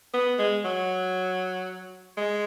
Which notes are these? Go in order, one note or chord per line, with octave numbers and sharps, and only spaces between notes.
B3
G#3
F#3
G#3